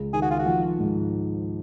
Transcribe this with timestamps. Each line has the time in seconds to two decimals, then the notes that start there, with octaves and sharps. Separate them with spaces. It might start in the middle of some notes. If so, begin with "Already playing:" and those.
Already playing: C#2
0.13 D#3 G#4
0.22 F#4
0.31 F4
0.39 F#4
0.46 F3
0.79 G#2